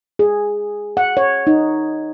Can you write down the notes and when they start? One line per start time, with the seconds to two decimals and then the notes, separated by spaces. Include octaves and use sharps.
0.19 G#4
0.97 F#5
1.17 C#5
1.47 D#4